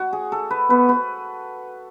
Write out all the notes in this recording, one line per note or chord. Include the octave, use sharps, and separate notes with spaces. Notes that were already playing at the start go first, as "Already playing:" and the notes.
Already playing: F#4
G#4
A4
B4
B3 B4
B4